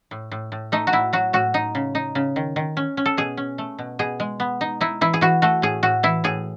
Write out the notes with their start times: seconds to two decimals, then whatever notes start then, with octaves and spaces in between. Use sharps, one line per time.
0.11 A2
0.32 A2
0.52 A2
0.72 A3 D#4
0.87 F#4
0.92 A2 E4
1.13 F#3 F#4
1.33 A2 F#4
1.54 D#4
1.75 C#3
1.95 D#4
2.15 C#3
2.36 D#3
2.56 D#3
2.77 C#4
2.97 C#4
3.06 A4
3.17 B2 G#4
3.37 C#4
3.58 A3
3.79 B2
3.99 B2 G#4
4.20 G#3
4.40 B3
4.61 D#4
4.81 D#4 E4
5.01 E3 E4
5.14 G#4
5.21 E3 F#4
5.42 A3 F#4
5.62 A2 G#4
5.83 A2 F#4
6.03 E3 E4
6.24 A2 G#4